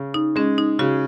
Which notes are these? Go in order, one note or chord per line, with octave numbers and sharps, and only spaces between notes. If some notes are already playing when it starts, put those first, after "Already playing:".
Already playing: C#3
D#4
G#3 C#4
D#4
C#3 F#4